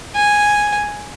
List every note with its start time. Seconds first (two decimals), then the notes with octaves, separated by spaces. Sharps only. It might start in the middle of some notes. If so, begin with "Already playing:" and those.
0.15 G#5